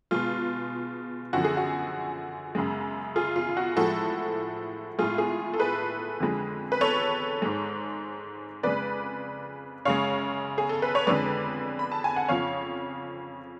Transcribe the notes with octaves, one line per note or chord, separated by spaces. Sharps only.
B2 G#3 F4
F#2 D3 F3 F#4
G#4
F#4
F#2 C#3 G#3
F4 G#4
F4
F#4
A2 F3 G#3 F#4 A4
A2 G#3 F4 G#4
F4 G#4
A4
G#4 B4
F2 D3 F3 G#3
B4
A4 C#5
G#2 G#3
F2 C#3 G#3 B4 D5
F#2 C#3 G#3 C#5 F5
G#4
A4
B4
C#5
F2 D3 G#3 B4 D5
B5
A5
G#5
F#5
F2 C#3 F3 C#5 F5